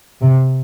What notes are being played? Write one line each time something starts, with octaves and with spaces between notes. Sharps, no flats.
C3